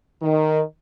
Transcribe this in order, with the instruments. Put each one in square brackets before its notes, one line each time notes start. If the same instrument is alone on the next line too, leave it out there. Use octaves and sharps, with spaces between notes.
[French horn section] D#3